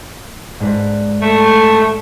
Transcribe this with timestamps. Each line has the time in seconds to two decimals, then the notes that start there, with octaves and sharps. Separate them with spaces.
0.60 G#2 D4 B4
1.22 A3